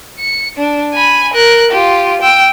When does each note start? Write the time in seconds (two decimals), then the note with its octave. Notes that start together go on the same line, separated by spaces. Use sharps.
0.19 C#7
0.57 D4
0.94 G#5 B5
1.34 A#4 F#6
1.71 F4 G4
2.21 G5 E6